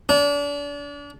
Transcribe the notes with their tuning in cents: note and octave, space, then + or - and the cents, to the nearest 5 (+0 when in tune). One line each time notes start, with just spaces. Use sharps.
D4 -35